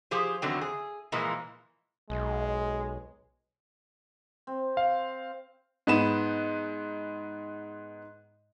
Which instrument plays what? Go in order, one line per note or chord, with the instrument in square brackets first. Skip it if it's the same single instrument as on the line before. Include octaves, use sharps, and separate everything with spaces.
[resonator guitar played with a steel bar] F3 G4 G#4 C5
E2 D3 D#3 F#3 C4
G#4
A#2 E3 F3 G#3 A#3
[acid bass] B1 [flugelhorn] G#3
[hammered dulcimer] C4
[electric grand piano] F5
[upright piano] G#2 B3 E7